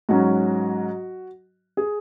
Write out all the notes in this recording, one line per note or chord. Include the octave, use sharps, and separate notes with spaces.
G#2 F#3 C#4 F#4
G#4